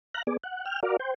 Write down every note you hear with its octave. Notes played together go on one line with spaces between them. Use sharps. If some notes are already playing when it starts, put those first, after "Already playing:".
F5 A#5 F#6
B3 G#4 D5
F#5
G5 F6
F#4 A#4 D5 F5
C5 G5